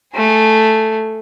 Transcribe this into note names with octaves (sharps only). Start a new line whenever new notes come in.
A3 G#4